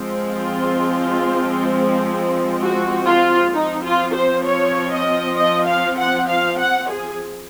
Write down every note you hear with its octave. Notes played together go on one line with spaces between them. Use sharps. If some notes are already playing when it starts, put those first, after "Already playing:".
Already playing: F3 G#3 C4
F4
F#4
F4
F3 C4 D#4
F4
C5
C#5
D#5
D#5
F5
F#5
F5
F#5
G#4